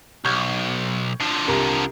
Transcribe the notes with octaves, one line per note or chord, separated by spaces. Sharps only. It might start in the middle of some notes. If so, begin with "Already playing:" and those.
B1 C#6 G6 G#6
D3 F3
C2 A#4